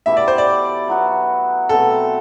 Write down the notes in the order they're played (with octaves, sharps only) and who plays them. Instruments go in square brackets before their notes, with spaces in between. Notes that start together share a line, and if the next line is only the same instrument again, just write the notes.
[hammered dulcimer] B2 A3 E4 G4 [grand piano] E5
[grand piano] D5
C5
D5
[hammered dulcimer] F#3 B3 F#4
[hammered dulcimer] B2 F#3 A3 C4 [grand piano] A4